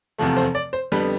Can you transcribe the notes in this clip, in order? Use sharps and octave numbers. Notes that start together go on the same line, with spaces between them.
F1 E2 C3 F3 A3
C5
D5
C5
F2 D3 G3 B3 B4